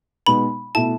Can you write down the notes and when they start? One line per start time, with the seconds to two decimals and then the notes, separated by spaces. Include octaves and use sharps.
0.27 B2 G#3 B3 D#4 B5
0.75 B2 A3 E4 A5